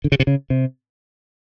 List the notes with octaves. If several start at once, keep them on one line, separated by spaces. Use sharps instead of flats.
D3
C#3
C3
C#3
C3